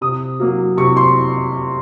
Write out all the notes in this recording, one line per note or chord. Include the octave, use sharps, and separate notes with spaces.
C3 D#6
F#3 A#3
C3 C#6
C6